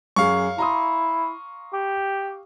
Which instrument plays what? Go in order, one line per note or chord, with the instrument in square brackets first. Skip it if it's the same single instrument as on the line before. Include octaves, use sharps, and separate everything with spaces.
[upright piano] F#2 G#4 [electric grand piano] F5 C#6
[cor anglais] E4 [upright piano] A#5 C6 D#6
[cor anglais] G4